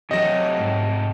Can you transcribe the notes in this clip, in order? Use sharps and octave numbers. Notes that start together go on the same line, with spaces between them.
C3 F#3 A3 G4 C#5 D#5 A#6
G#2